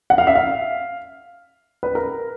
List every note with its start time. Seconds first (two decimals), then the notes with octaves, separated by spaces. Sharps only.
0.10 F#5
0.18 F5
0.27 E5
0.35 F5
1.83 B4
1.95 A#4